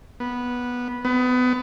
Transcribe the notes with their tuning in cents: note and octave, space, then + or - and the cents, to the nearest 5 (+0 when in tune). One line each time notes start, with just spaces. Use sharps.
B3 -10
B3 +25